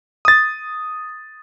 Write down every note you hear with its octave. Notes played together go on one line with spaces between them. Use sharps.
D#6 A6